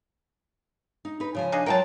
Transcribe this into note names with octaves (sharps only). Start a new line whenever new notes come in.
D#4
D#4 B4
C#3 F3 G#5
D4 D#4 G#4
F#3 F4 A#4 F#5 G5 A5